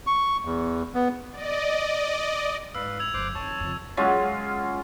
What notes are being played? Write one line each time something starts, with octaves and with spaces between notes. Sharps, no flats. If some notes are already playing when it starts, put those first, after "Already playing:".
C#6
E2
B3
D5 D#5
G#2 B4 F5 E6
E6 G#6 F7
G1 F#3 C5 D6 F#6
F2 D#3 C#5 A5 C#6
F2 C#3
F#3 G#3 C#4 F4